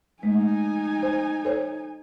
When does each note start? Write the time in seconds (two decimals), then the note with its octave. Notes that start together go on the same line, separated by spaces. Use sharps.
0.23 G#3 A3 D#4 G#5
1.03 C5
1.45 A4 C5 C#5